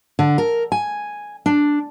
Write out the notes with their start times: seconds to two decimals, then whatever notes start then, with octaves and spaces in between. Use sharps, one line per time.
0.19 D3
0.38 A#4
0.72 G#5
1.46 D4